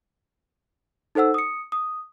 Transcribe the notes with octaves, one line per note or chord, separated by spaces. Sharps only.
D#4 A4 C5 F#5 E6
D#6 C#7
D#6